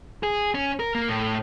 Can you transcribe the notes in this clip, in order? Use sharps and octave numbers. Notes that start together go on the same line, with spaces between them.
G#4
C#4
A#4
A#3
A2